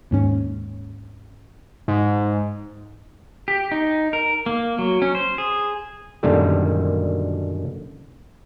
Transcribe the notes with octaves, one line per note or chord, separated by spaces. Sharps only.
D#2 G#2 C#4
G#2
G4
D#4
A#4
A#3
F#3
C#4
C5
G#4
F#2 A#2 D3 D#3 G3 A3